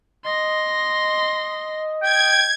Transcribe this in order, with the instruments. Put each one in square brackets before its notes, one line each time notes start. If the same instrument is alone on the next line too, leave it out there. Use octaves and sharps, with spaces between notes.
[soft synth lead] D#5 [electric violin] C6 A#6
[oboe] G5 [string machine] G#6